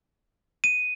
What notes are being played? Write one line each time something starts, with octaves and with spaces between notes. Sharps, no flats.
D#7